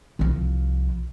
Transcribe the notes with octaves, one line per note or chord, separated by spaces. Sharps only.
C2 F3